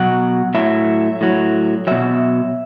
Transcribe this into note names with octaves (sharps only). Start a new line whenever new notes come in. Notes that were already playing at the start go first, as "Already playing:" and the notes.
Already playing: B2 F#3 F#5
A2 F#3 E5
A2 F#3
B2 F#3 E5